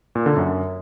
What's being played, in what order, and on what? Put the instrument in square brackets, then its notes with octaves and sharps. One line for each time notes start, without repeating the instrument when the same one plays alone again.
[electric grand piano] A#2
D3
F#2